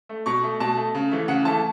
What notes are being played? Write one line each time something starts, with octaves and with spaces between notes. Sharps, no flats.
A3
B2 C#6
A3
B2 A5
A3
C#3
E3 A3
C#3 F#5
E3 A3 A5